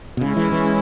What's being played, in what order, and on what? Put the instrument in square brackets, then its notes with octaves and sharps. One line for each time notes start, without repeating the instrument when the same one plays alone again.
[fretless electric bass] B2
[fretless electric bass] C#3 [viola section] G#3 C#4 E4
[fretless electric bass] E3
E3